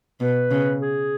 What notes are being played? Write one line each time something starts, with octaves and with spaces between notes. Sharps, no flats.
B2 B4
C#3
G#4